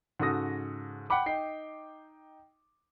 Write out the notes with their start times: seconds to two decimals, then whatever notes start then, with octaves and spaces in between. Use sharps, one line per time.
0.20 G#2 C#3 F#4 A4 D#6 A#6
1.10 F#5 G5 B5 D6
1.26 D#4 G5 C7